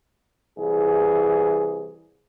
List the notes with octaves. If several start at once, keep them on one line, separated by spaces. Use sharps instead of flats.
C2 E3 G#4